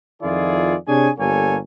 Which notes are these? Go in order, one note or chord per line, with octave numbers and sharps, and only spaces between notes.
F2 D#3 E4 F4 G#4 D5
C3 D4 G#4 C#5 G#5
G1 G3 A#3 A4 C#5 G#5